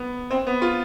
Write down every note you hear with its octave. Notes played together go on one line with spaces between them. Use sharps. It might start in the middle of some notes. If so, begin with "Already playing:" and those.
Already playing: B3
C4
B3
F4